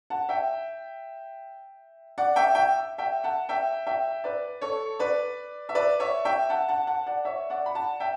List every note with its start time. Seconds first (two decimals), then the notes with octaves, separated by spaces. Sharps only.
0.10 F#5 A5
0.29 E5 G5
2.18 D5 F#5
2.36 E5 G5
2.55 E5 G5
2.98 E5 G5
3.24 F#5 A5
3.49 E5 G5
3.87 E5 G5
4.24 B4 D5
4.61 A4 C#5
4.99 B4 D5
5.69 E5
5.75 B4 D5
6.00 C#5 E5
6.25 E5 G5
6.50 F#5 A5
6.68 F#5 A5
6.87 F#5 A5
7.07 D5 F#5
7.25 C#5 E5
7.50 D5 F#5
7.66 B5
7.75 F#5 A5
8.00 E5 G5